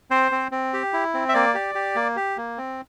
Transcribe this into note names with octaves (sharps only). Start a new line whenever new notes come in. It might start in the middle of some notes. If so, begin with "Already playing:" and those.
C4 C5
C4
C4
G4
E4
C4
E5
A#3 D5
G4
G4
A#3
G4
A#3
C4